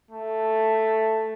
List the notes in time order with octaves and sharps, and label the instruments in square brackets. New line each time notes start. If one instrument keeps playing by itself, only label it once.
[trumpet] A3